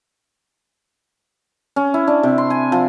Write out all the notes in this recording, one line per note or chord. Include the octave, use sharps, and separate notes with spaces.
C#4
E4
D4
C3
C6
G#5
F3